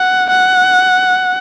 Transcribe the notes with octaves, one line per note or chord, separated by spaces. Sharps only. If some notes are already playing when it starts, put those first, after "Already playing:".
Already playing: F#5
F#5